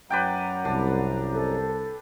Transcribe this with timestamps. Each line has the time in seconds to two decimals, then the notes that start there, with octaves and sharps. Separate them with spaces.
0.10 F#2 F#3 B4 D5 F#5 G5 A#5
0.65 C2 D4
1.33 A4